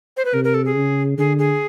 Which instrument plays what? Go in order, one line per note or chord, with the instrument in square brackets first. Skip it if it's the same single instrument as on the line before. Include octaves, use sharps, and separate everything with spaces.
[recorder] C5
B4
[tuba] C3 [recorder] A#4
[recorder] A#4
A4
G#4
[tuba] C#3
[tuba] D3 [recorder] G#4
[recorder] G#4